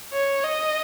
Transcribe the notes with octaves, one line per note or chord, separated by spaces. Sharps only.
C#5
D#5